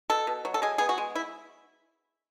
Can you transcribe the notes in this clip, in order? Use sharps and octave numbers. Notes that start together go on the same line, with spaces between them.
B2 A4
B2
F#3
A4
G#3 G#4
B3 G#4
F#4
G#3
E4